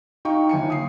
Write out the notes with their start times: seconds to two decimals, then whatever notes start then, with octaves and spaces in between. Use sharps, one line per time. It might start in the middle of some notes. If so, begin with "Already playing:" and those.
0.25 D#4 F5 G5 C#6
0.49 G1 D#2 G#5 C#7
0.70 D#6 C7